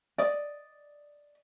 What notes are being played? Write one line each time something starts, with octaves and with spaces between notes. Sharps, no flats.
D5 D#5